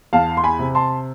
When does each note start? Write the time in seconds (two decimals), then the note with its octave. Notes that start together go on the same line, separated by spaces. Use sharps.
0.13 E2 F5 A5
0.37 C6
0.44 G#5 B5
0.59 C3
0.75 A5 C6